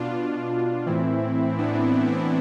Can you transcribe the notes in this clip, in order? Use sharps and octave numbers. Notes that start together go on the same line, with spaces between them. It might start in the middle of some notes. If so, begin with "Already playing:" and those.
Already playing: B2 D4 F4
A2 E3 C4 E4
B3 D4